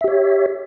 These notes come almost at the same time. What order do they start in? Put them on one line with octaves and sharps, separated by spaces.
E5 G4 C#5